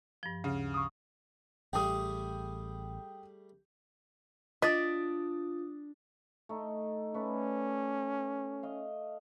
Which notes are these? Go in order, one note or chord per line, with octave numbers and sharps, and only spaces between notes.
G2 F3
D2 C#3
C#6 D#6
A1 G3 A3 G#4 G5 D#6
D4 F4 D5 D#5 D#6 A6 B6
A3 D#4
A3 C#4 B4 D5
D#5 F5